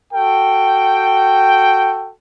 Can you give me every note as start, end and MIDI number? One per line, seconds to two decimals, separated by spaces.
0.14 2.13 66
0.14 2.13 69
0.14 2.13 79